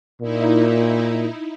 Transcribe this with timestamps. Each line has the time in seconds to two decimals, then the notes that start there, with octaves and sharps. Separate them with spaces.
0.22 A#2 D#4 E4